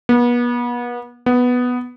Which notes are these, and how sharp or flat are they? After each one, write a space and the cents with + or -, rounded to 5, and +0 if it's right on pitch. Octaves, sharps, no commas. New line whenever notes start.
B3 -35
B3 +0